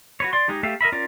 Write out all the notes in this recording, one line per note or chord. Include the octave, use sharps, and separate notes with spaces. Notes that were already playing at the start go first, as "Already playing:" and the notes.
F#4 B4 C#5
D5 C6
G#3 D#4 G4
A3 G4 E5 F5
A#4 D#5 E5 B5
C#4 F4 A#4 D5